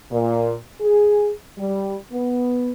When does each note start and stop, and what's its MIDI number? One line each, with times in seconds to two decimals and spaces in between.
0.11 0.54 46
0.80 1.31 68
1.58 1.97 55
2.12 2.71 59